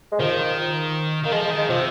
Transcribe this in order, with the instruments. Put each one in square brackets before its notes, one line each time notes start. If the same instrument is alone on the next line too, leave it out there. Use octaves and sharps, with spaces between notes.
[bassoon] G#3
[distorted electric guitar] D#3 [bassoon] F3
[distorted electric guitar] D#3 [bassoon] A#3
[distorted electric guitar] F3 [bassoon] G#3
[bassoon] G#3
[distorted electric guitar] D#3
[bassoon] G#3
[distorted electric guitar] C3 [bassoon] F3